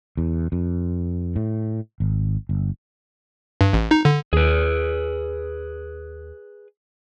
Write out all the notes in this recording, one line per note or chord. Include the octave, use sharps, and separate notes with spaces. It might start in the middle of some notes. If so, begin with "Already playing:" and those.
E2
F2
A2
G#1
G1
G2
A1
D#4
D3
D#2 G#4 B4